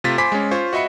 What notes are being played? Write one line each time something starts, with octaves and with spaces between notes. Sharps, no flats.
C3 A3 F4 A6 B6
C5 G#5 B5 C6 D6 B6
G#3 C#4
F4 C5 C#6 G#6
F#4 D#5 E5 B5 C#7